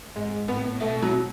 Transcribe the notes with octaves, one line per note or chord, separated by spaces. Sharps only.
G#2 G#3
A2 B3
B2 A3
F#3